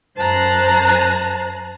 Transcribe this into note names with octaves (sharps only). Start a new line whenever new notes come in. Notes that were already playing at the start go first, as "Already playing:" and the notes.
F#2 C5 A5 A#5 F#6